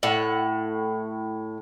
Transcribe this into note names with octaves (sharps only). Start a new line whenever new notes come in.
A2 F#5